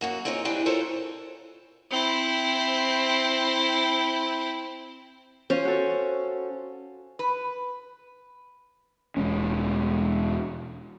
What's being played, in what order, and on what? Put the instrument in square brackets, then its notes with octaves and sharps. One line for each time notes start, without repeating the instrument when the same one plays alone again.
[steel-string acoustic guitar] F#2 A#3 F#4
C4 D#4 F4 G#4 C#5
E3 D4 D#4 G4 C5
F4 A4 A#4 C5 C#5
[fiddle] C4 E4
[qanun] C#4 [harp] F4 C5
[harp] F#4 A4
[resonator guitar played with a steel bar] B4
[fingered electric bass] E1 G#3 C#4